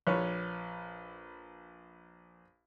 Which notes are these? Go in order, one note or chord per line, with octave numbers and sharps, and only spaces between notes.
A#1 B4 C#5